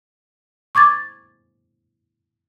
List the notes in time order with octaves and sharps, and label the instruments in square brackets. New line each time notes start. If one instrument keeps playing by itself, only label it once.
[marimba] C#6 D6 G#6 A6